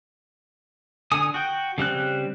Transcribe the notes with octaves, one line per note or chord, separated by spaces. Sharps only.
D3 G#5 D#6
F#4 G5
C#3 G3 C4 F#6